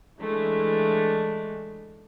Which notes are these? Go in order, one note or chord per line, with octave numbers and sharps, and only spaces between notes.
E3 G#3 A3 D4